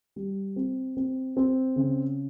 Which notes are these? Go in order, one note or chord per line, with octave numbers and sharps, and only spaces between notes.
G3
C4
C4
C4
C#3